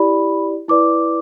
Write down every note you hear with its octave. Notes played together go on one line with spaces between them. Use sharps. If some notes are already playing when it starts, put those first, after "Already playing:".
Already playing: E4 G4 D5 B5
E4 B4 D5 D6